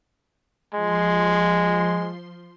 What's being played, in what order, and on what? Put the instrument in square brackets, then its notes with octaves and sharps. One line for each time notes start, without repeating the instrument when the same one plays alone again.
[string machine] F3 C6 [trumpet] G#3